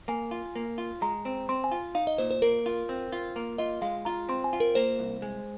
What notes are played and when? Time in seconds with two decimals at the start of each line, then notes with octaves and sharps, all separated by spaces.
0.08 A#3 G#5
0.31 F4
0.56 A#3
0.78 F4
1.02 G#3 A#5
1.25 C4
1.49 C4 C6
1.64 G#5
1.72 F4
1.95 D#4 F5
2.07 D#5
2.18 A#2 C5
2.31 C5
2.42 A#3 A#4
2.66 F4
2.89 C4
3.12 F4
3.36 A#3
3.58 F4 D#5
3.82 G#3 F5
4.05 F4 A#5
4.29 C4 C6
4.44 G#5
4.53 F4
4.60 A#4
4.75 A#3 C5
4.99 C2
5.22 G#3